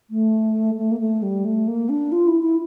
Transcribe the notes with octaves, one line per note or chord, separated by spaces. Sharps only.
A3
A3
A#3
A3
G3
A3
A#3
D4
F4
E4
E4